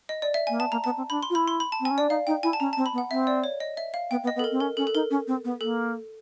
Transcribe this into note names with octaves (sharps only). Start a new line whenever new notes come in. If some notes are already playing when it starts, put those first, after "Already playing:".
D#5
D5
E5
A#3 G#5
B3 A5
A#3 A#5
B3 A5
C4
D4 B5
C6
F4
E4 B5
C6
B5
A5
C4
G#5
C#4
D4 D5
D#4 F5
D#4 G5
E4 G#5
A5
C#4 A#5
A5
C4
B5
B3
F#5
C4 E5
D5
C#5
D#5
E5
F5
B3 G5
B3
D#5
B3
A4
A#4
C4
C#4 A#4
C#4 A4
A4
D#4 A#4
C#4
C4
B3
A#3 A4